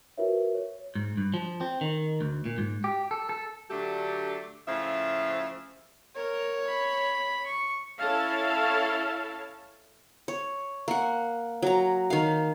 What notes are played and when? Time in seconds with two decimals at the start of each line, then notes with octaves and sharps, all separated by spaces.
0.18 F4 F#4 A#4 B4 C#5 E5
0.54 C#5
0.95 G#2
1.17 G2
1.34 F3
1.61 C4
1.81 D#3
2.21 D2
2.46 A#2
2.58 G#2
2.84 G4
3.11 A4
3.29 A4
3.71 D3 F#3 A3 D4 G4 A4
4.68 A2 C#3 F3 F4 E5
6.16 A#4 C#5
6.68 B5
7.47 C#6
7.99 C#4 E4 A4 C#5 F5 A5
10.28 C#5
10.88 A#3 F#5
11.62 F#3 A#5
12.10 D#3 F5